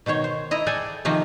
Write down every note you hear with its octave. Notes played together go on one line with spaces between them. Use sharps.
B2 D#3 C5 C#5
C5
E4 D#5 A#5
G#4 A4 D5 G5 G#5
C3 D#3 F3 A#3 C4